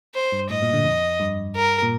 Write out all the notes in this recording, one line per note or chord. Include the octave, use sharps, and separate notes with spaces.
C5
G2
A2 D#5
A#2
D3
F2
G2
A#4
A#2